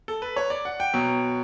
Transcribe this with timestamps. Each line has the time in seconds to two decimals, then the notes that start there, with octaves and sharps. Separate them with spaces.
0.08 A4
0.22 B4
0.36 C#5
0.50 D5
0.65 F#5
0.80 G5
0.94 B2 F#3